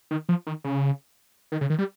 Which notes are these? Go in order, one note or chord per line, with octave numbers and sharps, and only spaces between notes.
D#3
F3
D#3
C#3
D#3
C#3
D#3
G3